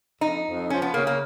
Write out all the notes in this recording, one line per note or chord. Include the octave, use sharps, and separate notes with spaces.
F2 D#4
F2
F3 C#4
B3
C#3 A#3
A#3